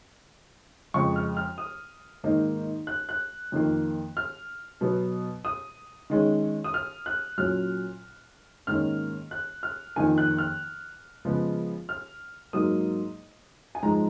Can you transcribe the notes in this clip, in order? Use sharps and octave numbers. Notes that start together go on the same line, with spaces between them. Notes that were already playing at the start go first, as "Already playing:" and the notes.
F2 C#3 G#3 C#6
F6
F6
D#6
G#2 D#3 A#3 D#4
F#6
F#6
F2 D#3 A#3
F6
B2 F#3 B3
D#6
D#3 G#3 C#4
D#6
F6
F#6
A#2 F#3 C#4 F6
G#2 D#3 A#3 C#4 F6
F#6
F6
F2 D#3 A#3 G#5
F#6
F6
C#3 F3 G#3 B3
F6
G#2 F#3 A#3 D#6
G#5
G#2 F3 G#3 A#5